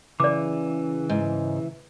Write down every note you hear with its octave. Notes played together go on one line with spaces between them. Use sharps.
C#3 E3 D5 D6
G#2